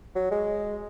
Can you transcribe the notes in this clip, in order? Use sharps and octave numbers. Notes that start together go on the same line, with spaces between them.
F#3
G#3